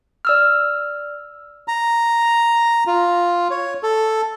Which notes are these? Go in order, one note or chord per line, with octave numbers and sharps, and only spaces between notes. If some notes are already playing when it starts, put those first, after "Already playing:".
D5 E6 F6
A#5
F4
C#5
A4